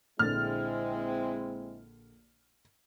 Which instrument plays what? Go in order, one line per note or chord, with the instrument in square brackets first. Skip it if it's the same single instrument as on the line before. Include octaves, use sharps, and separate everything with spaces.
[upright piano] A#1 D3 A6 [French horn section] G#3 C4 E4 [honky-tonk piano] F6